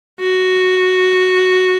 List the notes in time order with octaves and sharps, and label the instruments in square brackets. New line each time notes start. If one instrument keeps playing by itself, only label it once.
[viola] F#4